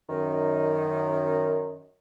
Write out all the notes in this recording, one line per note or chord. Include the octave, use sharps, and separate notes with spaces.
F#2 D#3